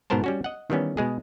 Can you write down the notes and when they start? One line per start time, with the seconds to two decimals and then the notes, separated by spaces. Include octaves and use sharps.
0.10 G#2 B2 B3 A#4 C5 A5
0.24 G3 C#4 F#4
0.44 D#5 F#5
0.70 D#3 E3 G3 B3 C#4
0.97 B2 G#3 G#4